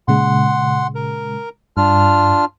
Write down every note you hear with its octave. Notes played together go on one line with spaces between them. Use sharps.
A#2 C#3 G#3 F#5 C6
A#4
G2 D4 F4 F6